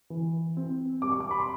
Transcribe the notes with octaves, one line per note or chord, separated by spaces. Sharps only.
E3
C4
G3 D6
C#6
D6
B5
C6